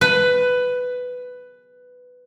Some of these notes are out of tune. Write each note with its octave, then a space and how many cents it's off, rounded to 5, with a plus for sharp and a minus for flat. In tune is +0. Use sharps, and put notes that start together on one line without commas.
B4 +10